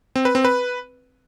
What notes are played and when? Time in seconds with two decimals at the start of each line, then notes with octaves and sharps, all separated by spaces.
0.16 C4
0.25 B4
0.35 C4
0.45 B4